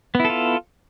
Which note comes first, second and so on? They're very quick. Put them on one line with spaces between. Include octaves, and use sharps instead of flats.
B3 E4 A4 F4